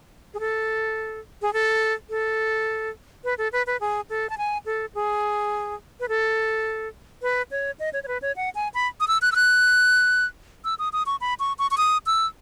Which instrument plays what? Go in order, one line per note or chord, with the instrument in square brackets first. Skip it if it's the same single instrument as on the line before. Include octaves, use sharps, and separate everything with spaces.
[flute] G#4
A4
G#4
A4
A4
B4
A4
B4
B4
G#4
A4
A5
G#5
A4
G#4
B4
A4
B4
C#5
D#5
C#5
C#5
B4
C#5
F#5
G#5
B5
D#6
E6
F#6
E6
F#6
E6
D#6
D#6
C#6
B5
C#6
C#6
C#6
D#6
E6